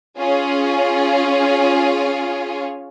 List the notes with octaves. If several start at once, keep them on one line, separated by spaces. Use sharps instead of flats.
C#4 F4 G#4 C#5